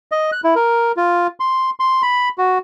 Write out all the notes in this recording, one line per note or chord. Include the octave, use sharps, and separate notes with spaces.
D#5
F#6
E4
A#4
F4
C6
C6
B5
F#4